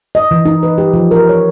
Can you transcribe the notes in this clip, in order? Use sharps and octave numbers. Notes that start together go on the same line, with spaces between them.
D#5
E3
D#4
B4
G4
F3
A#4
C#5